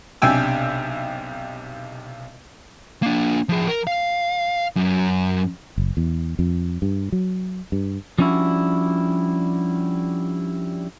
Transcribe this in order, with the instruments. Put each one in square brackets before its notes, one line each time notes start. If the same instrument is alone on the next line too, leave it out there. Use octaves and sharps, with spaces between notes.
[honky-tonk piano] B1 C3 D4 G5 G#5 E6
[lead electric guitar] A#3 D4
F3 G#4
A#4
F5
F#2
[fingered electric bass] F#1
E2
F2
G2
F#3
G2
[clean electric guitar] F3 G3 C#4 D4 E4 F#4